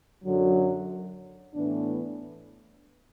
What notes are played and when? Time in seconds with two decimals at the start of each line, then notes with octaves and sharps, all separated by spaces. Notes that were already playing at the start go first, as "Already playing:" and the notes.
0.25 F#2 D3 F#3
1.54 A2 E3 B3 D4